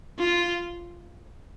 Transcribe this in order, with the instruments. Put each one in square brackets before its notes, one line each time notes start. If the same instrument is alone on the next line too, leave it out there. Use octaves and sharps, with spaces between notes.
[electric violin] F4